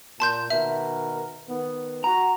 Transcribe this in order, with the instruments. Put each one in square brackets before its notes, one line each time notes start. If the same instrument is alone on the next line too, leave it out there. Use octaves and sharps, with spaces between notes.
[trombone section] A#2 [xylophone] A5 C6 G6
[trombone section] B2 D#3 A#4 [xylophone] E5
[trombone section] D#3 B3
[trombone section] F#4 [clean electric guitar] A#5